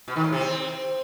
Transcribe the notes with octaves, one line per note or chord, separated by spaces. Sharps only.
B2
D#3
A2
C3
C4